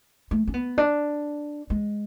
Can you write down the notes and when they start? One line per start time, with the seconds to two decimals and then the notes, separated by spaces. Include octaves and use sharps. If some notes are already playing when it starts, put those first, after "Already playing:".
0.31 A3
0.47 C#4
0.54 B3
0.78 D4
1.70 G#3